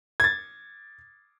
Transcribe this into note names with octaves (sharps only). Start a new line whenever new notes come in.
G#6 A6